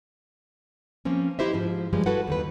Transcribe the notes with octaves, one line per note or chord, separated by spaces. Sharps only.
F3 A#3 C4 C#4
E4 G4 C5 D#5 E5
G#2 F3
G2 F3 G3 G#3
E4 F#4 A4 B4 F#5
D#2 D#3 B4